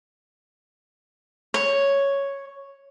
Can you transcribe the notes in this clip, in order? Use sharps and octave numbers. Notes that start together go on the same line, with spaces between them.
C#5